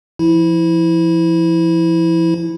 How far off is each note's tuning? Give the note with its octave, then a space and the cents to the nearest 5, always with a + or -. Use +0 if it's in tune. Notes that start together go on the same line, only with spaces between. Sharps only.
F3 -35 E4 -10